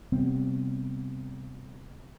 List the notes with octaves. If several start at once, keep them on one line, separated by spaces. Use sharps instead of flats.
C3 G3 B3 C4